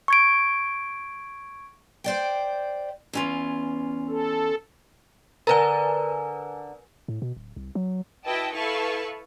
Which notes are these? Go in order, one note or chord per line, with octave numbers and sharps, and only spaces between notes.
C#6 G#6 D7
C5 D5 G5
E2 C#4 F4
A4
D3 A#4 B4 G#5 A#5
A2
B2
D1
C2
F#3
E4 F#4 B4 D#5 G5 A5
E4 A4 B4 F5 A5 C#6